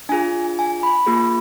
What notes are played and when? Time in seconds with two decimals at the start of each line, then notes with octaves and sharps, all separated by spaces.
0.09 D4 F4 G#4 G#5
0.59 G#5
0.83 B5
1.06 A#3 F4 G#4